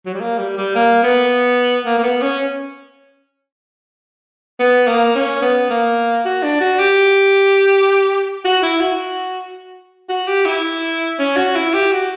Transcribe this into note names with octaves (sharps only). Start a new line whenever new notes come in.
F#3
G3
A#3
G3
G3
A#3
B3
A#3
A#3
B3
C#4
B3
A#3
C#4
B3
A#3
F#4
D4
F#4
G4
F#4
E4
F#4
F#4
G4
E4
C#4
F#4
E4
G4
F#4